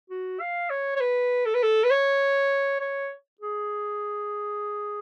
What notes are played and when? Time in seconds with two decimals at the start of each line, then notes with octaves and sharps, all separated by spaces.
0.10 F#4
0.40 F5
0.70 C#5
0.96 C#5
1.01 B4
1.46 A4
1.54 B4
1.63 A4
1.84 B4
1.91 C#5
2.81 C#5
3.41 G#4